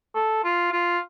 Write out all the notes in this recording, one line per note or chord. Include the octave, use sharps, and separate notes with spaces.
A4
F4
F4